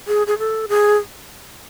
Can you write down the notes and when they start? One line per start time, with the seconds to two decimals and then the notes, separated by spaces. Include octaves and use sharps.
0.08 G#4
0.27 G#4
0.39 A4
0.69 G#4